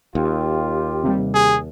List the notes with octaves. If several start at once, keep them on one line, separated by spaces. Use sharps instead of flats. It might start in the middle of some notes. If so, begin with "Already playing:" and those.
D#2 F4 G4
C3 G3
G#4